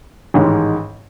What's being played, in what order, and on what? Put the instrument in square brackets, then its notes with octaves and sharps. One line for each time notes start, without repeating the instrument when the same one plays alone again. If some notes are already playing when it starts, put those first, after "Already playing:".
[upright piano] A1 G#2 D#3 G#3